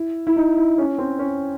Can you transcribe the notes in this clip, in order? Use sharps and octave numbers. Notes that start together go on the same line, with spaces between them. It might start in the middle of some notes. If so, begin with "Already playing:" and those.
Already playing: E4
E4
D#4
E4
C#4
C4
C#4